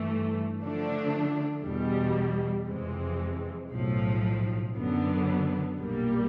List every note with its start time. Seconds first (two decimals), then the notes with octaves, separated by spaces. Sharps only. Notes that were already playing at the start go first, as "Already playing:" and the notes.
Already playing: G2 E3 A3
0.60 D3 F3 A3 D4
1.64 E2 B2 G3
2.68 F2 C3 E3 G#3 C4
3.71 B1 A2 F3
4.76 F#2 D3 F#3 B3
5.80 B1 A#2 G3 A#3